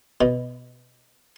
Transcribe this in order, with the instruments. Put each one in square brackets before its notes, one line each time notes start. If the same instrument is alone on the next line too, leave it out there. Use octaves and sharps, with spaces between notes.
[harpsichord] B2